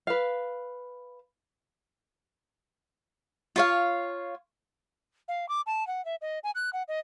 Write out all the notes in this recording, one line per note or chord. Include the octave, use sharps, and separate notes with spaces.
B4 F5
F4 C#5 F5
F5
D6
A5
F#5
E5
D#5
G#5
F#6
F#5
D#5